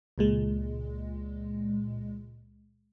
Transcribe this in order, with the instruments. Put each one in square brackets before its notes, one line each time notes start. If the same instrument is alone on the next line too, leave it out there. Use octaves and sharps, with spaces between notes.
[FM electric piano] C#2 A#2 G#3